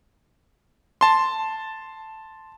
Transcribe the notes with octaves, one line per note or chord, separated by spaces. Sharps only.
A5 C6